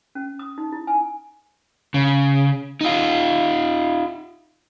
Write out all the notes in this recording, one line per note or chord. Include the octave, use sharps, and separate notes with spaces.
C#4
D#6
D#4
E4
G#5
C#3
D#4 F4